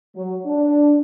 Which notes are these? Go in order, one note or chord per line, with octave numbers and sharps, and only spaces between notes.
F#3
D4